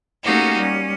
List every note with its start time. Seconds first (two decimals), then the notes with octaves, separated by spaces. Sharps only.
0.23 A3 A#3 C#4 D#4 F#4 G4
0.56 G3 C#4